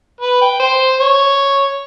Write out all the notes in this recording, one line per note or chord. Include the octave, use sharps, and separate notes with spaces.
B4
G5
C5
C#5